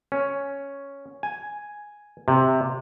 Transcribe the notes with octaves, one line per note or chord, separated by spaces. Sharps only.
C#4
G#5
C3